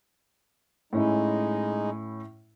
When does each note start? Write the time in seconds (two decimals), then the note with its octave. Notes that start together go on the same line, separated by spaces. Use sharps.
0.93 A2 G#3 C#4 D#4 E4